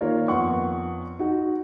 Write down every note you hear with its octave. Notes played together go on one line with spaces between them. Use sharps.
D#3 A#3 F4 A#4 C#5 D5
F2 B3 F#5 C6 C#6
D#4 F#4